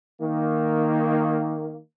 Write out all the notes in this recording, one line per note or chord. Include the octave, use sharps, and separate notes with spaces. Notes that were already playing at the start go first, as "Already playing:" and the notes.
D#3 A#3